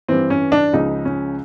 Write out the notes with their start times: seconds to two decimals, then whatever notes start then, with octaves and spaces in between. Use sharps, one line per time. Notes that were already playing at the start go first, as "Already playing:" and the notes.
0.08 G2 E3 C4
0.30 C#4
0.52 D4
0.73 C#2 C#3 F3 D#4
1.05 C#4